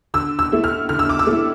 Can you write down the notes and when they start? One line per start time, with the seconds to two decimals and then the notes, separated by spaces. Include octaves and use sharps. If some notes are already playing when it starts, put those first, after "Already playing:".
0.14 D3 E6
0.39 E6
0.52 A3 E4
0.64 F6
0.89 D3 F6
0.99 E6
1.09 D6
1.19 E6
1.27 A3 E4